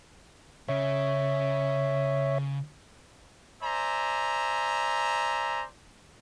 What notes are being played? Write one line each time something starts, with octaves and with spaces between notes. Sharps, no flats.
C#3 C#5 E5
C5 D5 E5 G#5 A#5